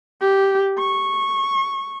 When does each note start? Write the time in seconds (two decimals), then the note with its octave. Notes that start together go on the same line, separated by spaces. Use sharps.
0.21 G4
0.79 C#6